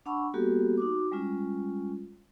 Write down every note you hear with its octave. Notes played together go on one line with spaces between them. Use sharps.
D4 F#5 A5 B5 C#6 E6
G3 A#3 B3 F#4 G4 A4
D#4 F#4 D6
G3 G#3 C#4 F4